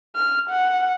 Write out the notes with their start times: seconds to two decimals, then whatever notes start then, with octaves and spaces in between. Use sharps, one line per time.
0.16 F6
0.49 F#5